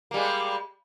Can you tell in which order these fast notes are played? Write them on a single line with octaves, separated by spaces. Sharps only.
A#3 G3 G#3